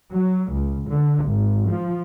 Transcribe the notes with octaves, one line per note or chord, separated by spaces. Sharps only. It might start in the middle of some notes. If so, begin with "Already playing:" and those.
F#3
C#2
D3
G#1
F3